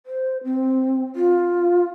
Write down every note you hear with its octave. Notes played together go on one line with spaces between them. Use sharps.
C5
C4
F4